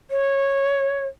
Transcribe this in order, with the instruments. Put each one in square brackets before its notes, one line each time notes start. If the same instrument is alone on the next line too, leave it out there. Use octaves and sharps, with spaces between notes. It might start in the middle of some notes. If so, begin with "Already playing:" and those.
[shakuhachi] C#5